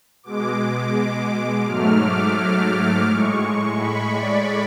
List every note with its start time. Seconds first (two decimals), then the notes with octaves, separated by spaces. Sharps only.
0.23 B2 G#3 D6
1.65 G#2 F#3 A3 F6
2.00 D6
3.06 A2 G#3 C#6
3.77 B5
4.12 D5